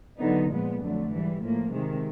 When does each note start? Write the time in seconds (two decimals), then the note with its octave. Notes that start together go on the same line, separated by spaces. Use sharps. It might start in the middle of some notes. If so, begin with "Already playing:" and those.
0.19 D3 F#3 B3 D#4
0.50 A#2 F3 G#3 B3
0.80 F2 D3 F#3 A3
1.10 G#2 E3 G3
1.41 A2 F3 A#3
1.72 C3 D#3 G#3